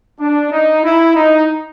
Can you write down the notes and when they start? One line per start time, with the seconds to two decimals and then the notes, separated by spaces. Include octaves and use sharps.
0.20 D4
0.52 D#4
0.84 E4
1.16 D#4